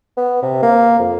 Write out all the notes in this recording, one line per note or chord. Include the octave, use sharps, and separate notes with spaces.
B3
C3
A#3
F2